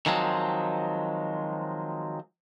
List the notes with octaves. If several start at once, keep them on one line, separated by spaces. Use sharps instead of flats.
D#3 F3 F#3 G#3 C4